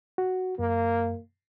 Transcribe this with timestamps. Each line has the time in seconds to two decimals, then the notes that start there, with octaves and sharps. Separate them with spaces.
0.18 F#4
0.59 F#2 A#3